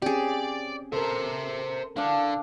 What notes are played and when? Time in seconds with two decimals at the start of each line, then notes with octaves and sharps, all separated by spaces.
0.02 C4 C#4 G4 G#4 D5
0.92 A4 A#4 C5 E5
1.97 D3 D4 F5